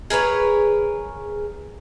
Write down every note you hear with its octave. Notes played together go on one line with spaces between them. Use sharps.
G#4 A#4 B4 C#5